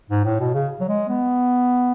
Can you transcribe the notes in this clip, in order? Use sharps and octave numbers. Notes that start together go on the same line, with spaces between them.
G#2
A2
B2
C#3
F#3
G#3
B3